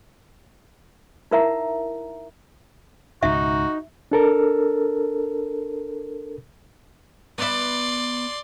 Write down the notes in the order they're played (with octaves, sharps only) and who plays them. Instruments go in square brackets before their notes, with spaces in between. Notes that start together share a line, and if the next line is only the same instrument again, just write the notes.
[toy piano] D#4 E4 A#4 E5 F#5 A#5
[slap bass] C#2 G#2 B2 [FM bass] D#4 [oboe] F#4 [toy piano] E5
[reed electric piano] D4 A4 A#4
[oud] B3 E5 [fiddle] D5 C6